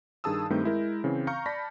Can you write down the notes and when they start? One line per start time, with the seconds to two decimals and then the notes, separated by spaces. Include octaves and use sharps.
0.24 G2 D#3 G#4 A5 D#6 E6
0.50 G2 D#3 A3 C4 G4 G6
0.64 G#3 E4 A#4
1.04 C#3 E3 C4
1.27 F5 A#5 C#6 F6 G6 C#7
1.46 D5 A5 B5 A#6 B6